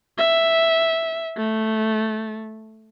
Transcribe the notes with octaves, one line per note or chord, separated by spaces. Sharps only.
E5
A3